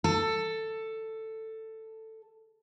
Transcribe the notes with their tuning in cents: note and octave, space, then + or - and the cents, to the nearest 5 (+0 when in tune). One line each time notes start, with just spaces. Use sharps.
A4 +10